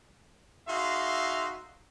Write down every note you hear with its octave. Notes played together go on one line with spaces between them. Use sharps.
D#4 F#4 G#4 E5 F5 C6